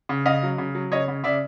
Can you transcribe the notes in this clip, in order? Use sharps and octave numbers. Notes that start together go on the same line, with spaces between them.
C#3
C#3 D#5 F5
F#3
C#3
F#3
C#3 C#5 D#5
C#3
C#3 D5 E5